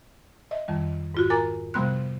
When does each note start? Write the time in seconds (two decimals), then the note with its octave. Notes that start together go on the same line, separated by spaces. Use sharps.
0.51 D#5 E5
0.68 F2 D#3 G3
1.14 G#2 F4 F#4
1.30 A#4 G#5 A#5 D6 A6
1.74 C3 F3 G3 B3 C6 F#6